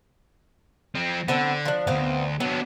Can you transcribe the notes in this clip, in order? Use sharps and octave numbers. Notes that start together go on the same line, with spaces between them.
F3 C4
D3 B3 C4 A4
F3 D4
D2 G2 B3 C4 F5
F#3 B3 D4